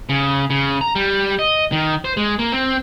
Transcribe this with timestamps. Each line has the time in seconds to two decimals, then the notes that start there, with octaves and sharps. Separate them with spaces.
0.09 C#3
0.50 C#3
0.81 A#5
0.95 G3
1.39 D#5
1.72 D#3
2.05 C5
2.17 G#3
2.39 A#3
2.52 C4